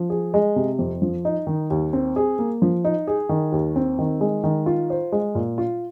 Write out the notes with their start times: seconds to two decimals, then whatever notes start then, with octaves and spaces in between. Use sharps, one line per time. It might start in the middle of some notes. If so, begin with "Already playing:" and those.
Already playing: F3
0.10 G#4
0.34 G#3
0.56 C3
0.79 F2
1.02 F3
1.25 D#4
1.47 D#3
1.70 D#2
1.93 C4
2.16 G#4
2.39 A#3
2.62 F3
2.84 D#4
3.07 G#4
3.29 D#3
3.52 D#2
3.76 C4
3.99 D#3
4.21 G#3
4.44 D#3
4.66 F4
4.90 C5
5.12 G#3
5.35 A#2
5.58 F4